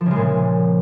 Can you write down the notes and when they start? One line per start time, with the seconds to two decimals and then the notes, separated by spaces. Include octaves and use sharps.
0.01 F3
0.06 C#3
0.11 G#3
0.16 A#2